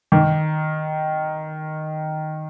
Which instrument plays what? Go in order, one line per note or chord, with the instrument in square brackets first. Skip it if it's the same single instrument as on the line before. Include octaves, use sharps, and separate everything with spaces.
[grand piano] D#3